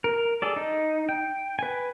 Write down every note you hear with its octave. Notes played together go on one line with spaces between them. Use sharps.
A#4
G#4 A4 D5
D#4
G5
B4 G#5